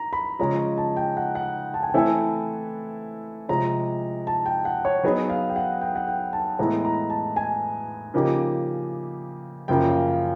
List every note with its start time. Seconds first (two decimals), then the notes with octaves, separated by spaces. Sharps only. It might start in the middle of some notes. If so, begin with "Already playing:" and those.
Already playing: A#5
0.13 B5
0.39 C#3 F3 G#3 C#4 A#5
0.78 A5
0.97 G5
1.17 F#5
1.35 F#5
1.74 A5
1.83 G#5
1.90 G5
1.94 E3 A3 C4 E4 A4 G#5
3.49 C3 F3 G#3 A#5
4.27 A5
4.46 G5
4.65 F#5
4.85 C#5
5.03 F#3 B3 D#4 G#4
5.30 F5
5.50 G5
5.56 F#5
5.81 G5
5.96 F#5
6.07 G5
6.33 A5
6.59 A2 E3 G#3 B3 E4 A#5
6.85 A#5
7.10 A5
7.36 G#5
8.14 C#3 F3 A#3 D#4 G4
9.68 F#2 C#3 F3 A#3 G5
9.89 F5
10.08 F5